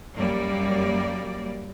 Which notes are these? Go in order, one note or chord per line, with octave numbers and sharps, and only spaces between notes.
F#2 G3 A#3 D5